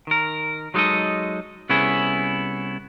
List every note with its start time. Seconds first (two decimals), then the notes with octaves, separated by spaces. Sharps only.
0.07 D#3 A#4
0.74 F#3 G#3 D#4 F4 A4 D#5
1.69 C2 B3 C#4 E4 G#4